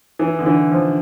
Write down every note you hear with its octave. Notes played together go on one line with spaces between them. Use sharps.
E3
D3
E3
F3